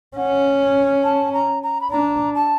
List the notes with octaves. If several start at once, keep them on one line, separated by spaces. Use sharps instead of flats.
C#4 F#5
A5
A#5
A#5
B5
D4 A#5
A5